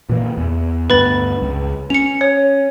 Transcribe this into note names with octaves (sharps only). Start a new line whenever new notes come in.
A#2 E3 A#3
E2
D2 G2 B3 B4 B5 A6
C#2
C#4 C#7 F7
C#5